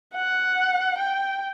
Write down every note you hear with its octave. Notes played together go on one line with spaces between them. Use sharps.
F#5
G5